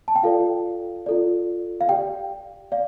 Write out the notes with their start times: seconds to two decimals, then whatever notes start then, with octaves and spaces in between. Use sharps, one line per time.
0.08 A5
0.16 G5
0.23 F4 A4 D5 F5
1.06 F4 A4 D5
1.81 F5
1.89 G4 D5 G5
2.72 D5 F5